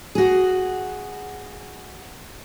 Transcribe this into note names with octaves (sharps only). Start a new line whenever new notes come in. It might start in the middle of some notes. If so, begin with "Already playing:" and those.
F#4 G#4